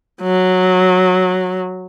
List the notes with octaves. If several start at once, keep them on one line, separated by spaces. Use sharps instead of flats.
F#3